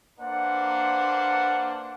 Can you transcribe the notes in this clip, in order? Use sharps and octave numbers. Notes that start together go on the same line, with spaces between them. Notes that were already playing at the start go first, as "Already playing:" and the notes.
A#3 D4 B4 C5 D5 F#5